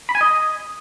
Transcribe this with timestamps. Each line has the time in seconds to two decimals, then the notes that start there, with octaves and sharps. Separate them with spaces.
0.09 B5
0.15 G#5
0.21 D#5